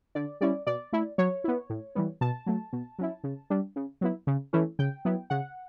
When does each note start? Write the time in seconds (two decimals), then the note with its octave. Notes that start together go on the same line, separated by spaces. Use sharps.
0.15 D3 D5
0.41 G3 C#4 E4 D5
0.67 B2 D5
0.93 A3 E4
1.18 F#3 C#5
1.44 B3 E4
1.70 A2
1.95 E3 G3 B3
2.21 B2 A5
2.46 F#3 A3
2.73 B2
2.99 F#3 C#4 E4
3.24 C#3
3.50 G3 D4
3.76 C#3
4.01 F#3 B3 E4
4.27 C#3
4.53 E3 A3 C#4 E4
4.79 C#3 G5
5.05 F#3 B3 E4
5.30 C#3 F#5